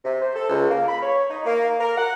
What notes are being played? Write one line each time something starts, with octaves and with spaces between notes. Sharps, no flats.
C3
C5
A4
C#2
A#3
B5
C#5
D#4
A#3
A#4
F#5